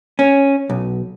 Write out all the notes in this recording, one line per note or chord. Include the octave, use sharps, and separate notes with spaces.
C#4
B1